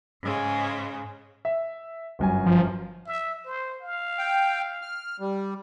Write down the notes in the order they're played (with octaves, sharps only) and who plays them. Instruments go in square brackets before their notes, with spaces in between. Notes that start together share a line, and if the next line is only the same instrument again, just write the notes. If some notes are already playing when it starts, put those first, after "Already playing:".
[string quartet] G#2 C#3 G#3
[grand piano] E5
G1 F#2 G#5
[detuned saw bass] F3
[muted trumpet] E5
C5
F5
[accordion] G5
F6
G3